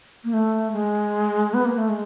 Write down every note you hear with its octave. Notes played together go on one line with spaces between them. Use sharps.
A#3
A3
G#3
B3
A#3
A3
G#3